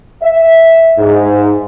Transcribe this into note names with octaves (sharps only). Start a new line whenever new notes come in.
E5
G#2